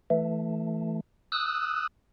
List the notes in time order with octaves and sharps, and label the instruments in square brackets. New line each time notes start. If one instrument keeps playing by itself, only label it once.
[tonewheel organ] E3 A3
D#6 E6 F#6